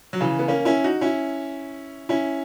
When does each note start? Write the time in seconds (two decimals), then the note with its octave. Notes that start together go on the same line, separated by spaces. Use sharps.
0.13 F#3
0.20 C#3 E3
0.39 B3
0.48 A#3 C#4
0.65 C#4 E4
0.84 D#4 F#4
1.01 C#4 E4
2.09 C#4 E4